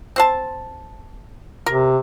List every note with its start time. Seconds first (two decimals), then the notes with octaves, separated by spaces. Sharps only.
0.16 C4 C5 A5
1.66 C3 A#4